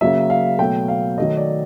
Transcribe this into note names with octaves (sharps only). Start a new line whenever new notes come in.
C#3 F#3 A#3 E5
F5
B2 F#3 A3 G5
F5
D#3 F#3 A3 D#5
D5